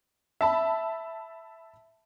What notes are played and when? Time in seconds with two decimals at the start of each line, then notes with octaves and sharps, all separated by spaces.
0.41 E5 A5 B5